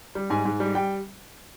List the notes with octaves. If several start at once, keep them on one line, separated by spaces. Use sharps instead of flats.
G3
G#2 G#5
G#2
G3
G3 G5